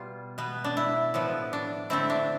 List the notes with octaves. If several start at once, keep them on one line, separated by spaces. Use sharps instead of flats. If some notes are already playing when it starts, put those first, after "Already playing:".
Already playing: B2 G3 F4
B2 B3
D4
E4
A2 F3 B3
D4
D3 A3 C4 E4
D4